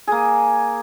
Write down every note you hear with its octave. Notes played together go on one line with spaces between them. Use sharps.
A#3 G#4